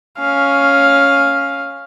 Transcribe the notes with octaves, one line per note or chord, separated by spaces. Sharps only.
C#4 F5